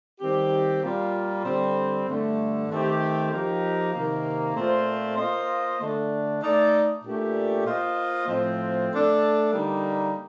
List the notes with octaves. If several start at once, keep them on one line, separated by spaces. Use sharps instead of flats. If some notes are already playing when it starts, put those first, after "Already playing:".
D#3 G3 C4 G4
A#2 G3 A#3 F4
D3 G3 C4
G2 D3 A3
D#3 A3 C4 G4
F3 A#3 D#4 G4
C3 D#3 A#3
A#2 A3 C4 F4 C5
A#3 F4 C5 D#5
D3 A3 D4
A3 D#4 A4 D5
A#2 A3 D4 G4 A#4
A#3 F4 C5 D#5
A2 F3 C4
A3 D4 A4
D3 G3 A#3 D#4